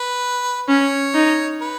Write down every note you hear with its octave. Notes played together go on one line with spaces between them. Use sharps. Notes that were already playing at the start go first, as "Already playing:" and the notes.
Already playing: B4
C#4 C#5
D#4
B4